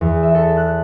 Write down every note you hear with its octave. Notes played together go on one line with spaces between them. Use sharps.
E2
E5
A4
F#6